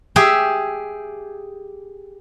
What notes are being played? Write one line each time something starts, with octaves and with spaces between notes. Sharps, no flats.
G4 G#4 E5